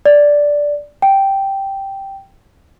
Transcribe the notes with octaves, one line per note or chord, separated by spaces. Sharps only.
D5
G5